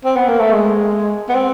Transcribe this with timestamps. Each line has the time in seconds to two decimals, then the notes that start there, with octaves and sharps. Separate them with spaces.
0.05 C4
0.16 B3
0.28 A#3
0.40 A3
0.52 G#3
1.29 B3
1.35 C4